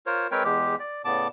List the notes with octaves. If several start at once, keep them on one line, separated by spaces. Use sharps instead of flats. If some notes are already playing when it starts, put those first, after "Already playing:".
F4 A#4 C5 C#5
G#3 C4 A#4 B4 C#5 G5
E2 G#3 G4
D5
A2 C#3 B3 D5 A5 D6